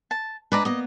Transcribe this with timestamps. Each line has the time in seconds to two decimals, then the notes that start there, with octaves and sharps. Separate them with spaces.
0.11 A5
0.52 G#3 D4 B4 D5 G#5 A#5
0.65 A#3 B3 D#5